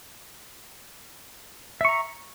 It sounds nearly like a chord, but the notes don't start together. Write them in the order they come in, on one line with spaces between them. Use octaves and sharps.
E5 C#6 A#5